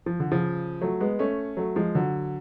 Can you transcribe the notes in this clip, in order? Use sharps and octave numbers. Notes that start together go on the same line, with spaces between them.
F3
D3
C#3 F3
F#3 A3
G#3 B3
A3 C#4
F#3 A3
F3 G#3
D3 F#3